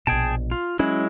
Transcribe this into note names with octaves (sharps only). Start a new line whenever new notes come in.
A#1 B2 G#4 G5 A5
F4
F#3 G#3 C#4 E4